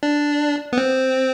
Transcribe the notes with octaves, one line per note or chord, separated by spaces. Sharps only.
D4
B3
C4